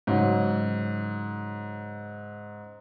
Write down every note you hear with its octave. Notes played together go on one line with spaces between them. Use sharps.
G#2 C#3 F#3